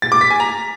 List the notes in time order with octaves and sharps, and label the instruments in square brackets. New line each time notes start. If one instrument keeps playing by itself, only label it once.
[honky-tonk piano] A6
D6
B6
G#5
A#5